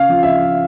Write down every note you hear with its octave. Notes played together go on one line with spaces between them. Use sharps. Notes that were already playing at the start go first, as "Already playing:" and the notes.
Already playing: C#3 F5
F3
E5